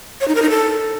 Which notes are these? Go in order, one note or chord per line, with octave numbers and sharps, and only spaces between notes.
C#5
D#4
A#4
D#4
A4